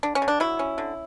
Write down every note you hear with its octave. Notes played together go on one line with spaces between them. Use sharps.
D3 D4
C#4
D3
D4
F#3 E4
C#4
D3